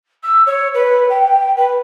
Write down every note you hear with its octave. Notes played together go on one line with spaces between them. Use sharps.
E6
C#5
B4
G5
B4